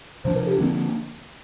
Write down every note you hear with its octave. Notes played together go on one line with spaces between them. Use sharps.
C3 F3 D4 C5
A#4
G4
D3 F3 A#3 C4 D4